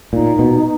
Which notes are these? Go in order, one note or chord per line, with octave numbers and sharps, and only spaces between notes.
A#2 D#4
B2